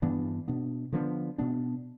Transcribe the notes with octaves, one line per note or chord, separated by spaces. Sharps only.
G2 E3 B3 D4
B2 B3 D4
D3 F3 B3 D4
B2 B3 D4